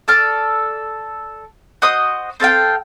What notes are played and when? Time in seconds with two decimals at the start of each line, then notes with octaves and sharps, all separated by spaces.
0.08 A4 D5 F6
1.82 F#4 C5 D#5 D#6
2.40 C4 A4 F5 G5